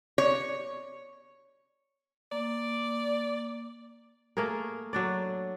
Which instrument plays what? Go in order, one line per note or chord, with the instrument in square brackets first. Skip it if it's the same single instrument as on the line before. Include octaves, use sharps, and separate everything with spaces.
[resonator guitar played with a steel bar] C#5
[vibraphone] A#3 [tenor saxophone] D5
[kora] A3 A#3 G#4 A#4
F#3 D4 D5